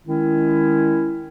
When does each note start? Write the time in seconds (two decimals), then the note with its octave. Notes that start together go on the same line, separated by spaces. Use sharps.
0.06 D#3 G#3 C#4 E4